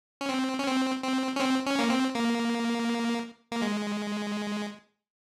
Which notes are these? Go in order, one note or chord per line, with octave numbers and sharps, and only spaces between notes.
C#4
C4
C#4
C4
C4
C#4
C4
C#4
A#3
C4
A#3
A#3
G#3